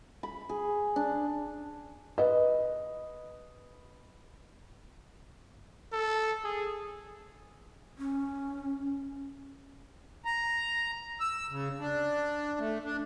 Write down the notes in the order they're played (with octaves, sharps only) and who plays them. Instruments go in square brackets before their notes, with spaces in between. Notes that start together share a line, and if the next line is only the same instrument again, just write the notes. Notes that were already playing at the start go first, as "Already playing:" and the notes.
[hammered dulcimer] B5
G#4
D4
[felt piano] B4 D#5
[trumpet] A4
G#4
[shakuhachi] C#4
[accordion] A#5
E6
C#3
D4
A3
D4